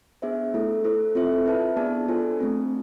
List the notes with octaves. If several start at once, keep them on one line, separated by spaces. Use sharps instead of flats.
B3 D4 G#4 C5 E5
A3 E4 A4
E4 A4 C5
C4 F4 A4 C5 E5
E4 B4 E5 A5
B3 D4 G#4 D5 A5
D4 F4 A4 C5 G#5
A3 C4 F4